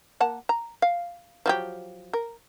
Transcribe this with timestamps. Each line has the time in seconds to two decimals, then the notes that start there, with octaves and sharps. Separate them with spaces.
0.20 A#3 F#5 A5
0.49 A#5
0.82 F5
1.46 F3 F#3 G4
2.13 A#4